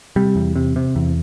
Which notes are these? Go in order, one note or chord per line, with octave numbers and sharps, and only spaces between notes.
C3 G3
E2
C3
C3
E2